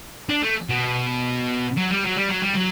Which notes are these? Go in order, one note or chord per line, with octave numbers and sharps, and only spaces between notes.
D4
A3
B2
F#3
G3
F#3
G3
F#3
G3
F#3